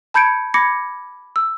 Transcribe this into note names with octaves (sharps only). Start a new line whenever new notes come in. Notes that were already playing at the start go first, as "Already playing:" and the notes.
A5 B5 G6 G#6 C#7 D7
B5 D6 G#6 A#6 C#7
E6